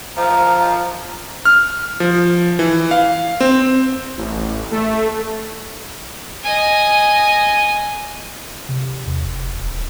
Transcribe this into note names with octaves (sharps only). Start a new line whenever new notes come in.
F3 A#5
F6
F3
E3
F5
C4
A1
A3
D#5 G#5
C3
E2
F1
D1